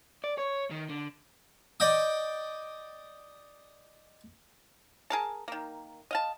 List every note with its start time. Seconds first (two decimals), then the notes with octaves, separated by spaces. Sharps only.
0.24 D5
0.38 C#5
0.71 D#3
0.90 D3
1.80 D5 D#5 G5 D#6
5.10 G#4 A#4 A5
5.48 D#3 A#3
6.11 D#5 F5 A5